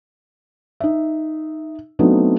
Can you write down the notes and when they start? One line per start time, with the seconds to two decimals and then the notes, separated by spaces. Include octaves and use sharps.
0.80 D#4 E5
1.99 F#3 A3 B3 C4 D4 D#4